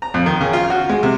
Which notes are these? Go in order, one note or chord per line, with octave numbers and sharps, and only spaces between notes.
A#5
F2
D#3
C#3
F4
F#4
G#3
C3